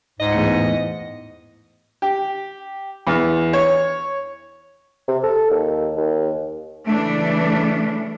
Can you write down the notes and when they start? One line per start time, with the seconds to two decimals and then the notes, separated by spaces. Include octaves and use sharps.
0.20 C#2 G#2 D#5
0.32 E2 A2 C#7
2.02 G4
3.07 E2
3.53 C#5
5.08 C3
5.23 A4
5.50 D#2
5.97 D#2
6.87 C#3 E3 G3 A3 D4